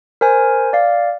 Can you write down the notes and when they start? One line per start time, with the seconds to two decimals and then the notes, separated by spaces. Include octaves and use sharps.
0.21 A#4 C5 G#5
0.73 D5 F5